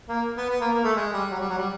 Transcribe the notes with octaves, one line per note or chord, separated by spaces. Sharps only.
A#3
B3
B3
A#3
A#3
A3
G#3
G3
F#3
G3
F#3
G3